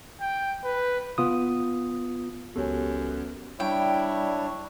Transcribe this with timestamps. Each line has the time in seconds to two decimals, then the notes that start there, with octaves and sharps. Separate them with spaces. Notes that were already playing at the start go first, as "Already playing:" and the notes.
0.21 G5
0.64 B4
1.18 B3 F4 D#6
2.56 C#2 F#2 B3 G4 A4 C#5 G#5
3.60 G3 D4 E4 C#5 G5